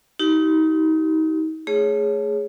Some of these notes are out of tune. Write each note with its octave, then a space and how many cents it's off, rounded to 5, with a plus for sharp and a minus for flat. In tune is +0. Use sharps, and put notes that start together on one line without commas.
D#4 +30 G4 -30
A3 -5 G#4 +0 C#5 +0